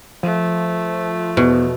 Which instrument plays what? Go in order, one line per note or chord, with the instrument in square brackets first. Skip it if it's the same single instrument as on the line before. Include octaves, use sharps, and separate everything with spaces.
[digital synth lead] F3 [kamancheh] A3
[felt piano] E2 [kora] B2